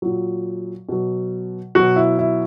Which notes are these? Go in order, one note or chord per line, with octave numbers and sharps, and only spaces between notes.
A#2 F#3
B2 F#3
B2 F#3 F#4
E4
E4